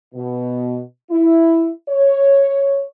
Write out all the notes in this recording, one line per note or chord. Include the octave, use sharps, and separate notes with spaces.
B2
E4
C#5